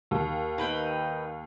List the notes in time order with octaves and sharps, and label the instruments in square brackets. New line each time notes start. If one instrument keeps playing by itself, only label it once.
[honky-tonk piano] D#2
[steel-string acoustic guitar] D#4 B4 G5